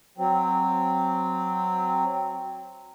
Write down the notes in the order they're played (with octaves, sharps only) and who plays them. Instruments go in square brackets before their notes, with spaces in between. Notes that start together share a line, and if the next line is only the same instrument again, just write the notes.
[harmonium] F#3 C4